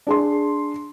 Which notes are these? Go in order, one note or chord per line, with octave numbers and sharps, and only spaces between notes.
D4 G#4 C6